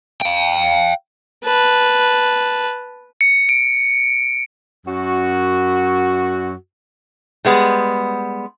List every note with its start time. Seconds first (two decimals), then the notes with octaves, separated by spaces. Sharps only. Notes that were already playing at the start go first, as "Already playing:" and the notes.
0.21 F5 G5
1.44 B4 A5
3.21 C#7
3.49 D7
4.86 F#2 F#4
7.45 G3 G#3 B3